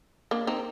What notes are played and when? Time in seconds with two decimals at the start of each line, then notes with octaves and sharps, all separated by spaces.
0.31 A#3 D4
0.47 C4 D#4